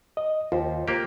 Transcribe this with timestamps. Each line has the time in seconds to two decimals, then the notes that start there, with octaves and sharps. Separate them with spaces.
0.17 D#5
0.52 D#2 F4 C5
0.88 A#3 G4